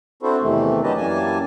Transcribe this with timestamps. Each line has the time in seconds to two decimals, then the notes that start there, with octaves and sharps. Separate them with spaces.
0.23 C4 D4 E4 F#4 A4 C5
0.42 E2 C3 D#3 E3 A3
0.83 F#3 D4 G4 B4 D#5 A5
0.97 F#2 E3 G3 A#3 G#5 A5